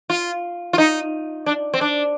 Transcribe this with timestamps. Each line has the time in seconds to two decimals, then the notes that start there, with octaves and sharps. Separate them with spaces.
0.10 F4
0.73 F4
0.78 D#4
1.46 D4
1.74 C4
1.81 D4